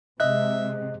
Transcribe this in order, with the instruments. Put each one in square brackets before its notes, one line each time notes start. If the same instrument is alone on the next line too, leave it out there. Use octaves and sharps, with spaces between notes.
[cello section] C3 G#3 [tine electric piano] D#5 F#6 [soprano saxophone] E5